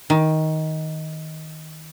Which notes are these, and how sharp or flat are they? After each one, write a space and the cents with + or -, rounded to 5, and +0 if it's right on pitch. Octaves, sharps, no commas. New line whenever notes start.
D#3 +15